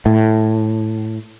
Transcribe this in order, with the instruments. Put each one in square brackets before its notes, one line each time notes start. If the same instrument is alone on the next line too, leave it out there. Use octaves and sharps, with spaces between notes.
[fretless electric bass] A2